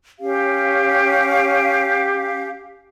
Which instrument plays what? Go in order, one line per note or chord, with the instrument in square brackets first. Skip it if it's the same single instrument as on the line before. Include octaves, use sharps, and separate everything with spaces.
[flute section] C#4 G4 F5